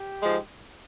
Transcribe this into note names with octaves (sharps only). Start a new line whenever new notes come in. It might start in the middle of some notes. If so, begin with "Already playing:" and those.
Already playing: G4
G#2 F3 G#3